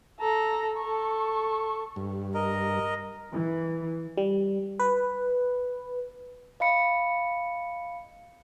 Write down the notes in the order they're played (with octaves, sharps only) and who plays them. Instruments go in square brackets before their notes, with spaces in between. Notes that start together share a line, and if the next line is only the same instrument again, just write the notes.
[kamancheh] A4 A#5
A4 C#6
[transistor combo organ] G2
[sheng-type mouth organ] A#4 D#5
[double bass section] E3
[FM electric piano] G3
B4
[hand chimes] D#5 F5 B5 C#7